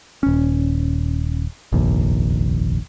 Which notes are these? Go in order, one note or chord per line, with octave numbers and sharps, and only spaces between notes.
D#1 C#4
F1 A#1 D#2